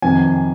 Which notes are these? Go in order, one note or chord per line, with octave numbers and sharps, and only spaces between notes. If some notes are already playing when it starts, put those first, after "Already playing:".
F2 C3 D#3 G#5